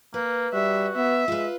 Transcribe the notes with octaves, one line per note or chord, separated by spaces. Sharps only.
A#3 B4
G3 F#4 E5
B3 E5
G#3 F4 B4